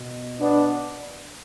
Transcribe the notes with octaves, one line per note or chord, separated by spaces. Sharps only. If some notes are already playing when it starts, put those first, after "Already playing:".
Already playing: B2
B3 D4